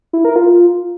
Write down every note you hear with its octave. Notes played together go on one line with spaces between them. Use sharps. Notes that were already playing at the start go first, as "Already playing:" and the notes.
E4
A#4
F4